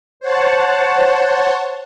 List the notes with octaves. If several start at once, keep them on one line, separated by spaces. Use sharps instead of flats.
C5 C#5 F#5 A5